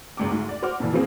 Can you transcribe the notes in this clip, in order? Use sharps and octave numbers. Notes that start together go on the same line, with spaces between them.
G#1 C#2 D6
D2 G#2
D5
F#4 C5 F#5 D6 F6
F2 A#2 E3
E3 F3 A#3 C4 G#4